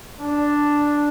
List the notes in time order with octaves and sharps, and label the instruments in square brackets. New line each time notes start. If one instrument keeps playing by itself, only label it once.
[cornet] D4